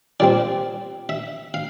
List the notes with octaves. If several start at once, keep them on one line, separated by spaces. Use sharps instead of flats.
A#2 G3 C4 D5
E5
F5